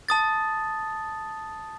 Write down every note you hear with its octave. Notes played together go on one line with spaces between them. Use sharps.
A5 D#6 A6